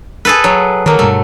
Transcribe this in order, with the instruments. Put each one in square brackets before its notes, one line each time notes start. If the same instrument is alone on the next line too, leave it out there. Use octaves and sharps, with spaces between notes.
[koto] G#4 A4 B4
F#3
[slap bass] D#3 [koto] F#3 A#3
[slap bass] G2 B2 G3 [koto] A3